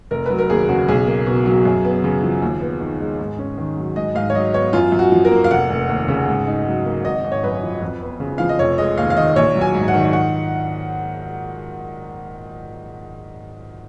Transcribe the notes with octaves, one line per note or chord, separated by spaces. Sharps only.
F1 A#4
F#3 B4
A#4
D#2 G#4
C#3 F#4
B1 G#4
A#3
B2
F#3
F#2
B3
C#3
F3
D#2
B3
D#3
G#3
G#2
C#4
D#3
F#3
G#2 D#5
G#2 F5
C#5
F#3 D#5
B3 C#5
F#2 F4
F#2
F#4
F3
A#4
A#3
F5
F1 F#5
F1
D#2
C#3
G#2
D#4
F#3
A#3
G#1 D#5
G#1
C#5
F#2 B4
F3
F2
B3
C#3
F3 F5
D#5
F1 C#5
G#3 D#5
D#2 F5
F5
D#3 D#5
A#1 C#5
F#3
G#5
G#2
F#5
D#3
F#5